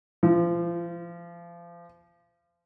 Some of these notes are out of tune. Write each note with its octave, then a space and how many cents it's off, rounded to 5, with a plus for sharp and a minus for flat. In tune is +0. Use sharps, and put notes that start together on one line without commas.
F3 -30